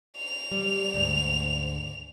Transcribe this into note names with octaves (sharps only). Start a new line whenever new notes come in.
F7
G3
D2 G#2